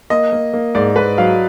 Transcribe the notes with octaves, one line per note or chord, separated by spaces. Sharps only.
A#3 D#5
A#3
A#3
G#2 D5
G#2 B4
F#3 F5